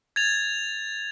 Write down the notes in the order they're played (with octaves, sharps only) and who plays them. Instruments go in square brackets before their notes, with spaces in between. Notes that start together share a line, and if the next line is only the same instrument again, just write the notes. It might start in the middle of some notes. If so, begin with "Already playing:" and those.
[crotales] G#6 A6 F7